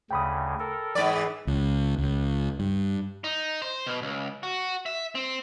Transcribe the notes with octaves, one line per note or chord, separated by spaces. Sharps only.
D2 C#3 G5 B5 D#6
A4 A#4
G#2 E3 D5
C#2
C#2
G2
D#4
C5
B2
C#2
F#4
E5
C4